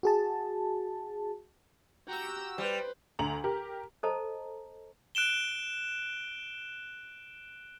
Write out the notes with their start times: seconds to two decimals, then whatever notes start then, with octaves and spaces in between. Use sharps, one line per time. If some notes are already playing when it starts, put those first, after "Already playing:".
0.03 F#4 G#4 A5
2.08 F#4 G4 G5 A#5 E6
2.58 G3 B4 C5
3.19 D2 A#5 F#7
3.44 G4 A#4
4.03 A4 C5 D#5 A5 A#5
5.15 F#6 D7 E7 G7